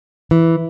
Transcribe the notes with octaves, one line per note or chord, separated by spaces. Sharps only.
E3